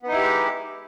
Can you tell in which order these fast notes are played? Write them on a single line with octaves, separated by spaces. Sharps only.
B3 D#4 E4 G4 G#3